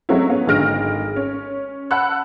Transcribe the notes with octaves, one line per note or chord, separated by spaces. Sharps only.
F#3 G#3 A3 C4 C#4 E4
B3 C#4
G#1 D3 G#3 F6 A#6 D7
C#4
F#5 A5 B5 E6 F#6